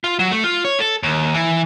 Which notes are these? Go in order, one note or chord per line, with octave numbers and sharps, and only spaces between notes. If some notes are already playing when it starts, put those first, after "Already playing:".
F4
F#3
A3
F4
C#5
A4
D#2
E3